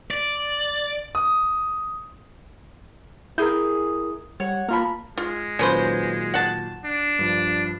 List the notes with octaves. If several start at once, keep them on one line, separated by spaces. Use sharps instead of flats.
D5
D#6
E4 G#4 A#4 G6
G3 C#5 F#5
A#3 F4 A#4 A5 B5
G#3 F4
A#2 D#3 F#3 C#4 B4 C5
F#5 A5
D4
G2 F3